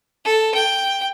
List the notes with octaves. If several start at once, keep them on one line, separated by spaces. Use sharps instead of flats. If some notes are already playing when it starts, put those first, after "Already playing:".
A4
G5